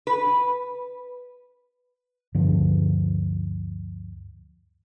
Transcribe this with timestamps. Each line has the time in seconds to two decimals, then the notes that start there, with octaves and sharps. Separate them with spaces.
0.07 B4
2.35 D2 G2 D3 F3